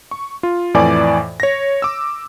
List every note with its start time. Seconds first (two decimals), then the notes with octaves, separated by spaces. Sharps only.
0.11 C#6
0.43 F4
0.74 F2 A2 E3 D5 G#5 D6
1.40 C#5 A#6
1.82 D6 E6